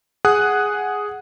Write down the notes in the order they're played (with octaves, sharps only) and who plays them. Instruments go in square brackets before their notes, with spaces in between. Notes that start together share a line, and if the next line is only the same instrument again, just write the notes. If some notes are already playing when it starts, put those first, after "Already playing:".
[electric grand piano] G#4 F#5 D#6 F#6